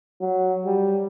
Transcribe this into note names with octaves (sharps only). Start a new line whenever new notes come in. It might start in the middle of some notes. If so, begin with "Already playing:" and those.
F#3
G3